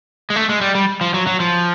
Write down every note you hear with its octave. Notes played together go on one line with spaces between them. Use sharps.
G#3
A3
G#3
G3
G3
F3
F#3
F#3
F3